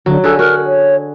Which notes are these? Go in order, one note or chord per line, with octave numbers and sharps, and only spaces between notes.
D3 F#3
D3 F#4 G#4 A4
F#4 A#4
C#5